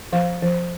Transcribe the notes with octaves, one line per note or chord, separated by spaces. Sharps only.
F3 F5
F3